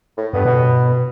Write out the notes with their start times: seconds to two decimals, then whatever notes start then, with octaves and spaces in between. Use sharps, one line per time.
0.17 A2
0.33 G2 B3
0.45 B2